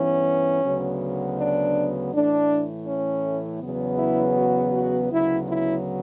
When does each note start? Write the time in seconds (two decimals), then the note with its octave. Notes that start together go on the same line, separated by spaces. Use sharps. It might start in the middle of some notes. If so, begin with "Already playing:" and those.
Already playing: G2 E3 B3 C#4
0.63 D2 C#3 F#3 B3
1.37 D4
2.12 A2 E3 A3 D4
2.87 C#4
3.61 E2 C#3 F#3 B3
3.98 E4
4.37 F#4
4.73 F#4
5.11 D2 C#3 F#3 B3 E4
5.48 E4